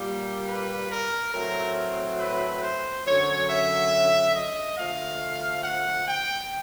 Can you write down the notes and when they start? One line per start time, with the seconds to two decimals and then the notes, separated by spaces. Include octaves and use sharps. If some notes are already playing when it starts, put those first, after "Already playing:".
Already playing: A#2 G3 A#3
0.48 B4
0.92 A#4
1.34 A2 F#3 A3 C4 A#4
2.20 B4
2.63 C5
3.06 F#2 D3 F#3 C#5
3.50 E5
4.35 D#5
4.78 D3 F3 A3 F5
5.64 F#5
6.08 G5